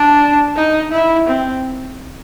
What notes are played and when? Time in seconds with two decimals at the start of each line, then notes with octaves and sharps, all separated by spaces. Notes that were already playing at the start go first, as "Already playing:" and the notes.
Already playing: D4
0.56 D#4
0.92 E4
1.27 C4